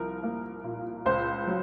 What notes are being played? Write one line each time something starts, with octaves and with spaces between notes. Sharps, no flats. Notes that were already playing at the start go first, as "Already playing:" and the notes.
Already playing: C2 F3 A#4
A#3
A#2
C#2 C5
F#3